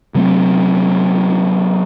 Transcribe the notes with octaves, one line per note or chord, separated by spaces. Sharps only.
C3 F#3 A3 C4